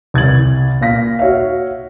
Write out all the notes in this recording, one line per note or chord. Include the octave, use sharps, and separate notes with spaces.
C2 G#6 A6 F#7
A#2 F5 A#6 B6
F#4 C#5 E5 F5